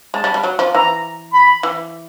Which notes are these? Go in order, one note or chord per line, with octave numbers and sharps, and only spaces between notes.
G#3 A5
G3
G3
F#3
F3
E3 A#5
B5
E3